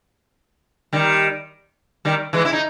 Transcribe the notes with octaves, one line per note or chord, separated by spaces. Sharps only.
D#3 G3
D#3 G3
E3 G#3
E4
D#4